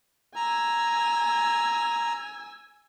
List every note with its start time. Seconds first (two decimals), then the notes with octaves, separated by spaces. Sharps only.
0.36 G#5 A#5 E6